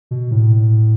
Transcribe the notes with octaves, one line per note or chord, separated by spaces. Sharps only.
B2
A2